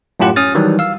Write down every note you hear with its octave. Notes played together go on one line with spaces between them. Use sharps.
F#2 A2 C#4 F4 G4 F#5
C#4 D#6 F6 A6
D#3 E3 F#3 G3
F5 E6